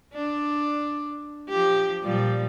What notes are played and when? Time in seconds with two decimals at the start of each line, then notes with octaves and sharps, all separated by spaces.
0.13 D4
1.49 F3 G4
2.03 A#2 F3 G3